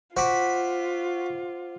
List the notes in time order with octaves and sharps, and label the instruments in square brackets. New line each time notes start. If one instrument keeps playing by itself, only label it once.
[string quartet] F4 [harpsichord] F#4 B5 [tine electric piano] C5 F#5 D6